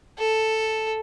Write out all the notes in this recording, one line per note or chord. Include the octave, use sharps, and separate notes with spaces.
A4